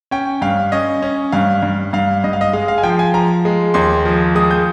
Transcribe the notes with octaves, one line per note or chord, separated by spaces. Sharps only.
C#4 G5
G2 F5
C#4 D#5
C#4
G2 F5
G2
G2 F5
G2 D#5
F5
D#5
G#3 F5
F5
G#5
F3 G5
G#5
F3 A#5
G#3
D#2 C6
F3
G#3 D#6
G6